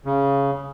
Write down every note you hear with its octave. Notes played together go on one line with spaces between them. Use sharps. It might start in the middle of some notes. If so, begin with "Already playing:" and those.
C#3